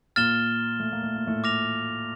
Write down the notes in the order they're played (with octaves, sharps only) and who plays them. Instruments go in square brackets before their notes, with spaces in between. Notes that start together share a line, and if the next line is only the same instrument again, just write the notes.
[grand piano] A#2 A#3 [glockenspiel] F6 A6 E7 G7
[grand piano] A3
A#3
A3
A#3
A2 A3
[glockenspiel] D6 F6 A#6 F7